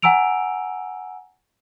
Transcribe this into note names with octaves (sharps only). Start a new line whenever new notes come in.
F#5 G#5 A#5 E6 D7 F7